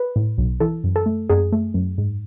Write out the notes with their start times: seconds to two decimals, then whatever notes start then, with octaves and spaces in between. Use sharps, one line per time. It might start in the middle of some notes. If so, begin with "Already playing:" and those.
Already playing: B4
0.16 A2
0.38 B1
0.60 E3 A4
0.84 F#2
0.96 A4
1.06 A3
1.29 F#2 G#4
1.52 A3
1.74 F#2
1.98 G#2